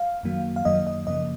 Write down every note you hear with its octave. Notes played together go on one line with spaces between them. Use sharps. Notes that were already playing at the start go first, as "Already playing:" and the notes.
Already playing: F5
F#2 D#3 F#3 A#3
F5
F#2 D#3 F#3 A#3 D#5
D#5
F#2 C#3 F3 A#3 D#5